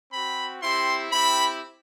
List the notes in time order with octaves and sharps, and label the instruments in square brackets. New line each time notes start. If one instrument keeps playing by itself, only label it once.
[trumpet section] C4 F#4 B5
C4 E4 G4 C6
C4 E4 G4 B5